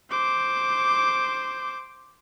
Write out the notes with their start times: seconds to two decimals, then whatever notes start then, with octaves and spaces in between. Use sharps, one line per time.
0.10 C5 D6